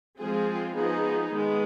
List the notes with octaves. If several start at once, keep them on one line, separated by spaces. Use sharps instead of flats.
F3 G#3 C4 F4 G#4
F3 B3 D#4 G#4
D#3 G#3 B3